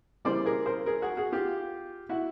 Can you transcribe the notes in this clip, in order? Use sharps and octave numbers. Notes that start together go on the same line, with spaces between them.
C#3 E3 G3 A#3 C5 D5
G#4 A#4
A#4 C5
G#4 A#4
F#4 G#4
F#4 G#4
F4 G4
E4 F#4